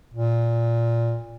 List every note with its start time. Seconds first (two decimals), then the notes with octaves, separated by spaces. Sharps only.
0.14 A#2